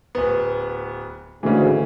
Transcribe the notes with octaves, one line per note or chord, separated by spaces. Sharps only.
D1 B3
D2 G#2 C#3 E3